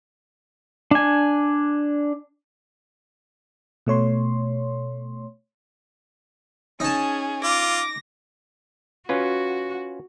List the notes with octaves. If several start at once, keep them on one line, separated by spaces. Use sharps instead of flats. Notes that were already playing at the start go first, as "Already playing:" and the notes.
D4 G#5
B2 A3 C#5 C6
C#4 D#4 G#4 A5
F4 D6 A#6
C#4 F4 F#4 B4